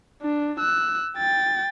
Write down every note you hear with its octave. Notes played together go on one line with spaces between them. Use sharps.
D4
E6 F#6
G5 A6